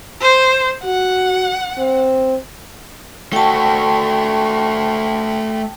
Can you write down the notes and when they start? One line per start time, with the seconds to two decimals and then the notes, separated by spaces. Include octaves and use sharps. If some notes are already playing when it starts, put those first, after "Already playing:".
0.22 C5
0.84 F#4 F#5
1.78 C4
3.33 A3 F#4 G5 A5